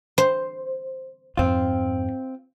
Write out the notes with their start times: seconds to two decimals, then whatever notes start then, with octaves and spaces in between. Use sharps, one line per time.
0.18 C5
1.37 F2 G#2 C4 F4